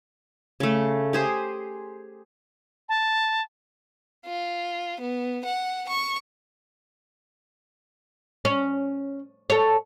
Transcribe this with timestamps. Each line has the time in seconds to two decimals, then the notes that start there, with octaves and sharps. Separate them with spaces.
0.60 C#3 A3
1.13 G4 G#4 C5
2.89 A5
4.26 F4
5.00 B3
5.45 F#5
5.88 C#6
8.45 C#4
9.50 A4 C#5